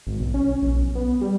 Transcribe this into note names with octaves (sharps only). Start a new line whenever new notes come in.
G#1
B1
C#4
A#1
B1
B3
G3